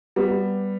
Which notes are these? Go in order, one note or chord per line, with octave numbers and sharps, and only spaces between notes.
G3 B3